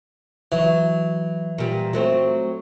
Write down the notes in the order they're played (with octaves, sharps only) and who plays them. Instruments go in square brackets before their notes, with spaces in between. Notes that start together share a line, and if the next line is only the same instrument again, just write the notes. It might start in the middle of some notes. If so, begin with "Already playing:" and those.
[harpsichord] E3 [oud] F#3
[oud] A#2 G3
F#3 A3 C4